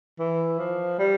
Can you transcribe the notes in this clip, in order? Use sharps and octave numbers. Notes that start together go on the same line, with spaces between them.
E3
F3
G3